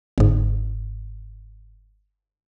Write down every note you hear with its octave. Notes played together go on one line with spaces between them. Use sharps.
G1 G#2